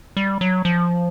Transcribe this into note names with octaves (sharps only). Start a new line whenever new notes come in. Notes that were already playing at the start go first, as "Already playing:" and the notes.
G3
F#3
F3